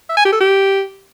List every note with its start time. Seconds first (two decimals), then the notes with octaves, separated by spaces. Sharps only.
0.09 E5
0.17 G#5
0.25 G4
0.33 A4
0.40 G4